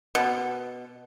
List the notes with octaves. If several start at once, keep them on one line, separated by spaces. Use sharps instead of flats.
B2